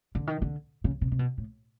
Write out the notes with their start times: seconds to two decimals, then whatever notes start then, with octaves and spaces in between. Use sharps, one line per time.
0.15 D3
0.27 D#3
0.42 D3
0.84 C#3
1.01 C3
1.12 C3
1.19 B2
1.38 A2